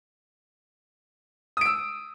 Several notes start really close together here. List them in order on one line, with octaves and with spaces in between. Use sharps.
D#6 D7 E6